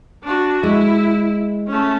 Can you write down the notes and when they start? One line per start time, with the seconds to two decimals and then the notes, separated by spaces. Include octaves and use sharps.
0.23 D4 F#4
0.63 G#3 E4
1.67 A3 C#4